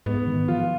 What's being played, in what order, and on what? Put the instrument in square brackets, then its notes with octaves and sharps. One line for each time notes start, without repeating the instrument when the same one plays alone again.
[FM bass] G#2 [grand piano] B3
[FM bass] D#3
[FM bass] F3 [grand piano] F4